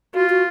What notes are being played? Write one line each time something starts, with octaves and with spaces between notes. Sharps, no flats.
F4 F#4
F#4